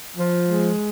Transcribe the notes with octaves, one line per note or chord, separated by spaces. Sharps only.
F3
G#3